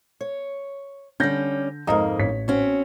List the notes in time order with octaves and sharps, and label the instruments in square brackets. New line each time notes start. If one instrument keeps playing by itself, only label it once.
[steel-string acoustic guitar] C#5
[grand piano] D3 G6 A#6 [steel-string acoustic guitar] G3 C#4
[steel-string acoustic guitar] F2 G#2 A#3 [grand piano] D#5 A#5 D#6
[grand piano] A1 C#5 B6
[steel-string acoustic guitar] C4 C#4 F#4